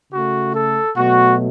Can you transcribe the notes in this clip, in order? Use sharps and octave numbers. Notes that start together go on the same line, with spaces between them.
C#3 A3 F#4
A4
B2 F#3 A3 F#4